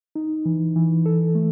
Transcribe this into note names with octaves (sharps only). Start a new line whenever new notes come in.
D#4
E3
E3
A4
A3